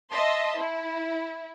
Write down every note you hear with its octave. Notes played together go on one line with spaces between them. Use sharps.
D#5 E5 A5 C6
E4